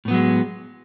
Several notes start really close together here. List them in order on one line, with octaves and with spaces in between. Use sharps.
A2 B3 F#3 G#3